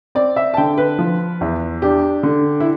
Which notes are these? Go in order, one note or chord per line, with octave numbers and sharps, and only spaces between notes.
C4 D5
E5
A5
D3 G5
B4
F3
E2
D4 G4
D3
E4